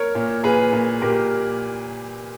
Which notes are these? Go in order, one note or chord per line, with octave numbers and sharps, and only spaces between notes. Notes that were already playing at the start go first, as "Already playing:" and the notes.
Already playing: A#4 C#5
A#2
A#2 G#4 B4
A#2
A#2 G4 A#4